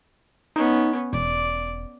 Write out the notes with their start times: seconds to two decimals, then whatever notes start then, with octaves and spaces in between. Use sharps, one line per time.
0.56 B3 C#4 D#4
1.13 E1 D5